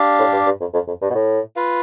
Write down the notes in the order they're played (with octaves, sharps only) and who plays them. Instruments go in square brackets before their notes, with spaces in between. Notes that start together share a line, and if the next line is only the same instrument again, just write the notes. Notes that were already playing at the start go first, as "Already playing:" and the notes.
Already playing: [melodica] D4 G4 D5 F5
[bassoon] A2
G2
G2
F2
F2
F2
G2
B2
A2
[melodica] F4 B4 F5